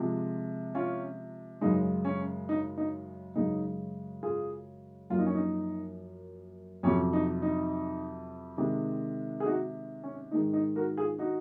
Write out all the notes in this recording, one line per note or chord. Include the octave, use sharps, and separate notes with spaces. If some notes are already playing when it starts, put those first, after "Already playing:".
Already playing: C3 F3 G#3
C#4 F4
F#2 C#3 G#3 D#4
C#4
D#4
D#4
F#2 C#3 G#3 D#4
F4 G#4
F#2 F3 A#3 F4
D#4
C#4
D#4
F2 C3 F#3 C#4
D#4
D#4
C3 D#3 G#3
G#4
D#4 F#4
C#4
G#2 D#3 G#3 D#4
D#4
F#4 A#4
F4 G#4
D#4 F#4